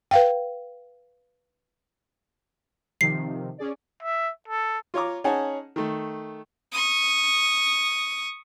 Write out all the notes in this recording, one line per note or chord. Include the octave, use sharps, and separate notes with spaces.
B4 F5 G5
C3 D#3 F3 C7
C#4 G#4 D5
E5
A4
F4 C#5 A#5 D6
C#4 D#4 G#4 F#5 G#5 A5
D#3 A3
C#6 D#6